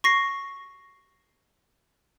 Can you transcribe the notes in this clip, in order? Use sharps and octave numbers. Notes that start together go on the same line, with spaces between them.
C#6 A#6 C7